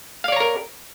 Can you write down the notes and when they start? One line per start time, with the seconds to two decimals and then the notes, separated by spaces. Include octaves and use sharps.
0.24 F5
0.28 D5
0.32 C#5
0.36 A#5
0.40 A#4